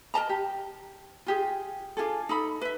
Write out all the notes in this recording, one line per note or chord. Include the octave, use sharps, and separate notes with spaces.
A#4 D#5 A5 A#5
G4
F4 G4 G#4
D4 F4 G#4 A4
D#4 A4 B5
B4 E5